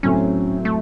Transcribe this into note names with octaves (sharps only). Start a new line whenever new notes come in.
A2 F#3 C4 C#4
A3